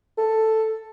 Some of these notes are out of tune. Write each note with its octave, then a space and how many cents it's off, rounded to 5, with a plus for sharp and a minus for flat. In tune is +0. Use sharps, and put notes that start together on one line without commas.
A4 +5